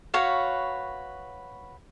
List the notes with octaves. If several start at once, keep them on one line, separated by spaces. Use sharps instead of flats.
F#4 B4 C#5 F5